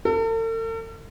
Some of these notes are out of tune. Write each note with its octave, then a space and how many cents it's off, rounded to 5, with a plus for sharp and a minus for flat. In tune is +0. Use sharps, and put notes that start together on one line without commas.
A4 +45